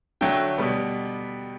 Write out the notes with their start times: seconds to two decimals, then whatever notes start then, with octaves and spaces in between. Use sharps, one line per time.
0.21 D3 F#3 A3 G5
0.58 B2 G3 B3